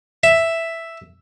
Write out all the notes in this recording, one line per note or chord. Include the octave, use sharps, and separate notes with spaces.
E5